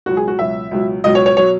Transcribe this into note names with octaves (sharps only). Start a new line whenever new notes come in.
C#2 B2 F#3 F#4
G#4
F#4
C#2 B2 F#3 E5
C#2 B2 F#3
C#2 B2 F#3 D#5
C#5
C#5
B2 F#3 C#5